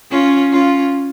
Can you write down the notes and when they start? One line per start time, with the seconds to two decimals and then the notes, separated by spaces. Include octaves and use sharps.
0.11 C#4 F4
0.52 C#4 F4